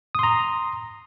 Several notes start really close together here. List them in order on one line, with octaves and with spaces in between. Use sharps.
D#6 C6 A#5